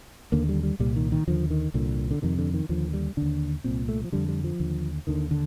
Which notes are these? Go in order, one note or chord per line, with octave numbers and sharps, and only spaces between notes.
D#2 D3 A#3
G3
G3
C2 A#2 G3
D#3
D#3
D#2 D3 F3
D#3
C2 A#2 D3
D3
F2 C3 D#3
D3
D#3
D#2 D3 F3
G3
D#2 D3 D4
C2 A#2 C4
A3
F3
F2 D3 G3
G3
F3
D#2 D3
D#2 D3 D#3
D3